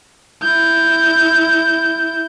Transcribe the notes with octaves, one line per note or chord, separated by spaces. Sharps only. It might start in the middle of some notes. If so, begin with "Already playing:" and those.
E4 G6